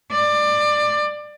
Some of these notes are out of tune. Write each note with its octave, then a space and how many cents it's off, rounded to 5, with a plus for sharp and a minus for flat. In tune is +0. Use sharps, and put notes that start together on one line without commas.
D5 +20